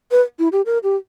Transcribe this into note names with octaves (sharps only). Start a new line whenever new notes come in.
B4
E4
G4
A#4
G4